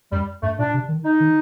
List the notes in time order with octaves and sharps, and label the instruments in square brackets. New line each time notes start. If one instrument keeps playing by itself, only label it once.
[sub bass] F#2 [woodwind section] G3
[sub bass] G2 [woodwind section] A3
[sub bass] A#2 [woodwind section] D4
[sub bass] C3
D#3
[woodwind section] D#4
[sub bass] D#3